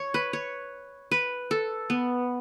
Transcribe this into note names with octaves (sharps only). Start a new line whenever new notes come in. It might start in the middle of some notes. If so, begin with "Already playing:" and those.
Already playing: C#5
B4
C#5
B4
A4
B3